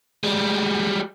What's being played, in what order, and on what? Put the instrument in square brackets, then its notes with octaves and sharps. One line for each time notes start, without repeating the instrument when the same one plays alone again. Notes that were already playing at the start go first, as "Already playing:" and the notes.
[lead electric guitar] G3 G#3